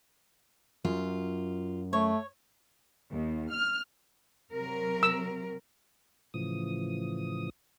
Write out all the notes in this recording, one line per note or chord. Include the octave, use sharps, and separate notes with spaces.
F#2 F4
A3 C#5
D#2
F6
C3 F#3 A#4
E6
A2 C#3 E3 F3 D#6